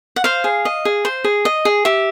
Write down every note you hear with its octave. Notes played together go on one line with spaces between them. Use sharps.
F#5
C5 F5
G#4
D#5
G#4
C5
G#4
D#5
G#4
G4 E5